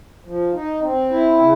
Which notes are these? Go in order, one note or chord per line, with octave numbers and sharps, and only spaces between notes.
F3
D#4
C4
E4
C#3